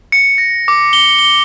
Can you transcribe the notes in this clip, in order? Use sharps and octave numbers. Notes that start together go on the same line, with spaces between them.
C#7
A#6
D6
G7
G7